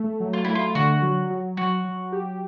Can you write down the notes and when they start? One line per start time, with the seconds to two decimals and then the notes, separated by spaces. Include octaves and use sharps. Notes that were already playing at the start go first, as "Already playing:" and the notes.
Already playing: A3
0.20 F#3
0.33 F4
0.45 A3 E4
0.55 F4
0.75 D3 F#4
1.02 F#3
1.30 F#3
1.57 F#3 F#4
1.85 F#3
2.12 G4